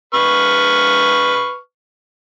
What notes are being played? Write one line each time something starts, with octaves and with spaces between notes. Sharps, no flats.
B4 C#6 F6